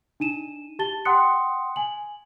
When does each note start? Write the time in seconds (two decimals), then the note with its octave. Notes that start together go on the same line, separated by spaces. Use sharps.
0.20 D4 D#4 D#7 E7
0.79 G4 A5 A6 G7
1.05 F#5 G5 C6 D#6 F#6 C#7
1.76 G#5 F#7